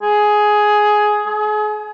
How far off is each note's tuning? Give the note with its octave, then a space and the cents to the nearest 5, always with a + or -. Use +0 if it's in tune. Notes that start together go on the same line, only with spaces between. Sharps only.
G#4 +10
G#4 +35